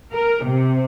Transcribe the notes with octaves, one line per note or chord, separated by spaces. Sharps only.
A#4
C3